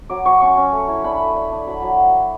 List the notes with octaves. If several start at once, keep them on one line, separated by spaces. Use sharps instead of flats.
F#3 D6
F#3 C#6
C#4 C#6
C#4
A3
E4
D4 B5
A3
D4
D4
F#3 B5
F#3